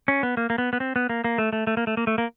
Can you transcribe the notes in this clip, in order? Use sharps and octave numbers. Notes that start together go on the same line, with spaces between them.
C#4
B3
A#3
A#3
B3
B3
C4
B3
A#3
A#3
A3
A3
A3
A#3
A3
A#3
A3
A#3